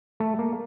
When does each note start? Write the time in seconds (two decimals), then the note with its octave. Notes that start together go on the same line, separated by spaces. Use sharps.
0.20 A3
0.39 A#3